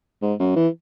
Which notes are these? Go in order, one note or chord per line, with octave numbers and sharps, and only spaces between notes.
G#2
F#2
E3